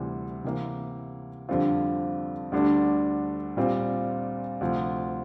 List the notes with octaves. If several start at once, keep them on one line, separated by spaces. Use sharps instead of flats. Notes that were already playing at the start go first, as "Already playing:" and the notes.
Already playing: D2 C3 E3 G3
C3 E3 A#3
F2 D3 G3 C4 F4
D2 D3 G3 D4
A#2 G3 C4 F4
D2 C3 F3